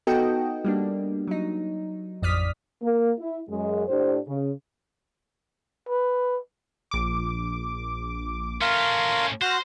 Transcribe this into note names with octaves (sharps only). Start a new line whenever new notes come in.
B3 D#4 F#4 A4 D#5 G5
G3 A#3 D4
F#3 D#4
A1 F2 D5 D#6 F6 B6
A#3
E4
F#2 G#3
A2 D4 G4 C5
C#3
B4
A#1 D6
A3 C#4 A#4 F5 C6
F#4 C5 C6 F6 F#6 A#6